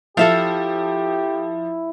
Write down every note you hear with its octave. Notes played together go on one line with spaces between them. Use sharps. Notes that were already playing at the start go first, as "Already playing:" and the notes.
F3 E4 G4 A4 E5 F5